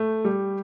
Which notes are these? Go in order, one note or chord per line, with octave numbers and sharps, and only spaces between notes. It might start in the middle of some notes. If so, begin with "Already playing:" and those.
Already playing: A3
G3